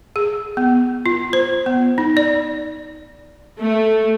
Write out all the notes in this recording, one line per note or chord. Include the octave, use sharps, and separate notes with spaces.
G#4
B3
F4
C5
B3
D#4
D5
A3